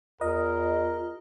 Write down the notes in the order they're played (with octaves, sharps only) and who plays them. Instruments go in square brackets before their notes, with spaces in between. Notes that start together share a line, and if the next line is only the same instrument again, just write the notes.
[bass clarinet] E2 [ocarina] F4 [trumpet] A#4 [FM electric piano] D#5